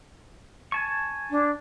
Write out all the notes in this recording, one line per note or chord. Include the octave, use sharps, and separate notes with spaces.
G#5 A5 C#6
D4